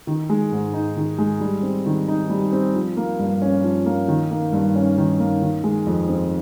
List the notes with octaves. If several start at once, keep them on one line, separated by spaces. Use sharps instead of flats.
D#3
G#3
G#2
D#4
D#3
G#3
G3
C4
D#3
D#4
G3
C4
F3
A#3
G2
C#4
F3
A#3
D#3
A#3
G2
C#4
D#3
A#3
D#3
G#3
F2
C4